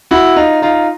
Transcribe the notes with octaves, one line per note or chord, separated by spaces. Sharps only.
E4 F#4
D#4 F4
D#4 F4